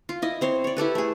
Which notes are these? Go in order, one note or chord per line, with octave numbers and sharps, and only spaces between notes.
F4
E4 D#5
C4 C5 C#5
C#5 D5
E4 G4 A4 B4
A3 G#4